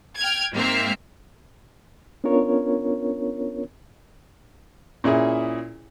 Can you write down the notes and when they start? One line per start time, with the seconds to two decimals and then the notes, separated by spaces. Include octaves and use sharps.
0.19 G5 F6 G#6
0.54 G#2 A#3 C4 E5 F6 C7
2.24 B3 C#4 D4 F4 A#4 C#5
5.04 A#2 C#4 E4 G#4